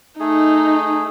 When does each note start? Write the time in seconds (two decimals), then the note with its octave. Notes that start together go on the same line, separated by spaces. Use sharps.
0.20 A3 D#4 G#4